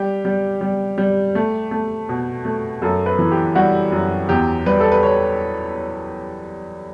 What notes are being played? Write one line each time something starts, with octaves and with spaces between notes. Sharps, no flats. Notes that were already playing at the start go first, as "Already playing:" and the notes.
Already playing: G3 G4
G3
G3
G3
A3
A3
B2
A3
F#2 A4
B4
E3
G4
G3 F#4
F#2
E2 G4
G3 B4
A4
B4
C#5